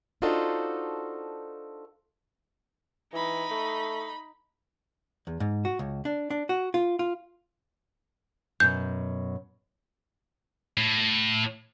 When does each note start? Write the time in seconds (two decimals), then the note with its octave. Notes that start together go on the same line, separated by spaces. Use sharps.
0.22 D4 D#4 F4 F#4 A4 C5
3.13 E3 D#4 B5
3.51 A3
5.27 E2
5.40 G#2
5.65 F#4
5.79 C#2
6.05 D4
6.30 D4
6.49 F#4
6.74 F4
6.99 F4
8.60 F#2 B2 G6
10.77 A2